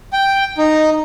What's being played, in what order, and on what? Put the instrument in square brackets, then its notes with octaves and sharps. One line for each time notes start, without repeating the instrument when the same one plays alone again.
[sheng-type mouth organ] G5
D#4